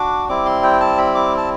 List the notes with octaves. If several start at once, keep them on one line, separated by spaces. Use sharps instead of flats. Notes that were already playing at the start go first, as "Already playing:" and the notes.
Already playing: D4 F#4 D6
G3 C4 E4 D6
C6
G5
A5
B5
D6
A5